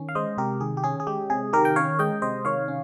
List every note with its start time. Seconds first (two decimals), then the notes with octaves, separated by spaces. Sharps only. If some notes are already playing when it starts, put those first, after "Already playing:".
Already playing: D#3 C#4
0.09 F5
0.15 G#3 C5 D#5
0.38 C3 G4 A#4
0.61 D#3 G#4
0.77 G4
0.84 C#4 G#4
1.00 G#4
1.07 G#3 G4
1.30 C3 G#4
1.53 D#3 G4 A#4
1.65 G5
1.76 C#4 C#5 F5
1.99 G#3 D#5 G5
2.22 C3 C5 D#5
2.45 D#3 C#5 F5
2.68 C#4